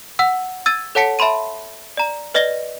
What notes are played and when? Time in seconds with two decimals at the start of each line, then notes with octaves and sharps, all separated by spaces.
0.19 F#5 E6
0.66 E6 G#6 A6 D#7
0.95 A4 C#5 F#5 A5 B6 C#7
1.19 E5 A5 B5 C6 D#7
1.97 D5 A#5
2.35 B4 D5 D#5 A#6 G7